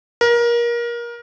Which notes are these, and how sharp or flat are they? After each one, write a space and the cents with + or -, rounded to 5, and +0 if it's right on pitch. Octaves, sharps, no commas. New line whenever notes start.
A#4 +25